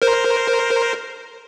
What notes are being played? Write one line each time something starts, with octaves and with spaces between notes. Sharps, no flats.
A#4 C5